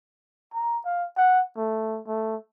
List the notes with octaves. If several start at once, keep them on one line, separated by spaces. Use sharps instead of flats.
A#5
F5
F#5
A3
A3